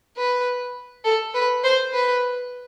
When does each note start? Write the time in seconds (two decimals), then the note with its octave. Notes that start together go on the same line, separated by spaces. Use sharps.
0.17 B4
1.04 A4
1.34 B4
1.63 C5
1.93 B4